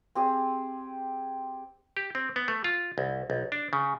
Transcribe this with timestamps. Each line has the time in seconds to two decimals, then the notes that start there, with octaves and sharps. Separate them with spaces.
0.15 C4 G4 G#4
1.97 G4
2.15 C4
2.36 B3
2.48 A3
2.64 F4
2.98 C2
3.30 B1
3.52 D4
3.73 C#3